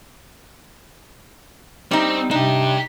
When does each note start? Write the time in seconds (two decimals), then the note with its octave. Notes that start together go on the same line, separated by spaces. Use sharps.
1.91 G3 C4 D#4
2.31 C3 D4 D#4 G4